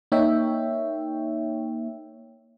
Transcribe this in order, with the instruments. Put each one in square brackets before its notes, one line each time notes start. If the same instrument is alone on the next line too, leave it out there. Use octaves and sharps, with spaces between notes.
[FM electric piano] A#3 D#4 C#5 E5 G5